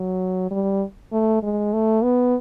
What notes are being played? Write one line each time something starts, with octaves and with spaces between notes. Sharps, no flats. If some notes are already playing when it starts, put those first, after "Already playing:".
Already playing: F#3
G3
A3
G#3
A3
B3